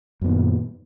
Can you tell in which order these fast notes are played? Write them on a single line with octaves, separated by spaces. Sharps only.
F#2 B3 D#3 A#2